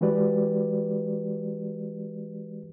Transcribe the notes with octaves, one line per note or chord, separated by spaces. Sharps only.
E3 G#3 F#4 G4 B4 D5